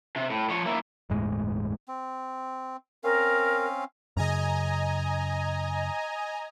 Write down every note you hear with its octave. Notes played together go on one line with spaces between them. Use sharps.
C3
A2
F3 C#5
A#3 E4
G1 E2 A2 G#3
C4
C4 C#4 A#4 F5
F#2 C#3 D#5 G#5 A#5